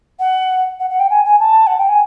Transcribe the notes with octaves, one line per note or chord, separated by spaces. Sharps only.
F#5
F#5
F#5
G5
G#5
G#5
A5
F#5
G5
G#5